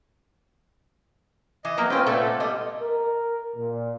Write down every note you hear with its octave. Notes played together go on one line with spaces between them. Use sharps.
E3 D#5
F#3 A#3 B3
C4 C#4 F4 B4 G5
A#2 A3 B3 A4
G3 D#5
A#4
A#2